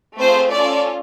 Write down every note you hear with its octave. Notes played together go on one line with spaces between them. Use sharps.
A3 C4 F4 G#4 C5
C#4 F4 A4 D5